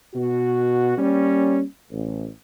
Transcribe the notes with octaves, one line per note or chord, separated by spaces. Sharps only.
B2 F#4
G3 A#3 C#4
A1